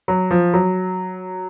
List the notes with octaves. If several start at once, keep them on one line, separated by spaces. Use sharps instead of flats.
F#3
F3
F#3